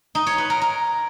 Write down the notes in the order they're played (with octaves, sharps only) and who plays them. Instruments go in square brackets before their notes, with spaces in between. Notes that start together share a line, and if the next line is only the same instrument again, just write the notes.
[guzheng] D#4
C#5
B4
A#4
A#4